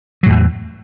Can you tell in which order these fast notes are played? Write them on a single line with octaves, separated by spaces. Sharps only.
F#3 A2 E2 E3